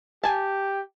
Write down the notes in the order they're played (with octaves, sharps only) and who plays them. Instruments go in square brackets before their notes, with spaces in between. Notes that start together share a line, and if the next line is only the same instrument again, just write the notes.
[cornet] G4 [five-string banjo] G#5 A5